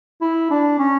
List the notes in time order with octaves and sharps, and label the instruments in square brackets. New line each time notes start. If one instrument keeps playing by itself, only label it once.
[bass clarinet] E4
D4
C#4